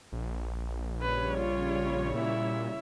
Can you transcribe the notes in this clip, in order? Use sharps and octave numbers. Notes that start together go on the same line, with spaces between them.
A#1
C#3 G3 B4 C#5
F4
A#2 E4 E5